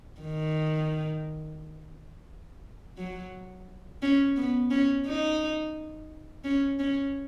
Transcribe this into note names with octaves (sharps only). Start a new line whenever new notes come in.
D#3
F#3
C#4
B3
C#4
D#4
C#4
C#4